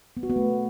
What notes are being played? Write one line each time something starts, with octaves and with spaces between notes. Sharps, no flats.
B3
F#4
B3
A3